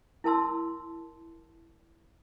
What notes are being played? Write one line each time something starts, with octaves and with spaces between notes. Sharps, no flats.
E4 A#4 A5 C6 E6